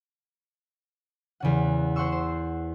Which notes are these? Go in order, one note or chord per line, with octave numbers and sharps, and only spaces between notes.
E2 C#3 F#5
C5 F#5 C6 C#6 E6
C5